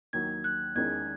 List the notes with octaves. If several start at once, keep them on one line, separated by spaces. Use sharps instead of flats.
D#2 D#3 F#3 G#6
F#6
E2 D#3 G#3 C#4 G#6